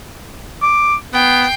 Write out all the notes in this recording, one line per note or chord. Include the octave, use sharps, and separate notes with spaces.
D6
B3 G5 C7